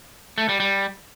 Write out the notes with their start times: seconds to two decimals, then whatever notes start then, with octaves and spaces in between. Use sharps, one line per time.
0.38 A3
0.49 G3
0.60 G3